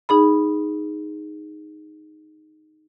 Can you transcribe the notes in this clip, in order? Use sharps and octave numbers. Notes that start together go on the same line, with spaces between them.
D#4 G#4 B5